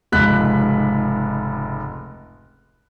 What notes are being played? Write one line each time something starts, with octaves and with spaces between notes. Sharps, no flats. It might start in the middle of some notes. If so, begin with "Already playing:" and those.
F1 C#2 G#2 B5 F#6 B6